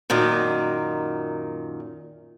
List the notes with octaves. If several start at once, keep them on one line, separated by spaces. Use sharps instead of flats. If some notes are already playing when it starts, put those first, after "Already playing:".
F#2 A#2 D#3